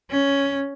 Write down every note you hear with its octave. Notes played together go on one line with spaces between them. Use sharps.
C#4